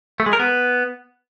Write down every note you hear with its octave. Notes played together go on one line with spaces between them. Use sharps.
A3
G#3
A#4
B3